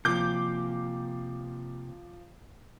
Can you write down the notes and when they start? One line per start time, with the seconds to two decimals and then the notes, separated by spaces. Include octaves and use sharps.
0.05 C3 F3 A#3 D6 G6